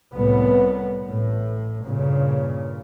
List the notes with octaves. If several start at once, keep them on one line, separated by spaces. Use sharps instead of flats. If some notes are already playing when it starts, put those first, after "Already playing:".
C2 A2 G3 B3
A1 A2
G2 A#2 C#3